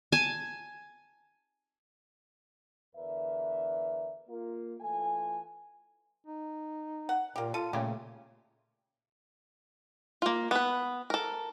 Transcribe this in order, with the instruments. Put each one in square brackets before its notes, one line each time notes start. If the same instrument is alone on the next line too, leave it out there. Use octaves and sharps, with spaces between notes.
[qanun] G#5 A5
[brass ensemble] E2 D3 A#4 B4 D5 E5
A#3 F4 A#4
E3 A3 F4 A4 G#5
[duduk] D#4
[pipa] F#5
[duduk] A#2 [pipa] A#3 G4
[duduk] F4 [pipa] A4 [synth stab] D#7
[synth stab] A#2 C#3 [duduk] A3 [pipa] G4
[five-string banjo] A#3 F4
B3 B4
A4 A#4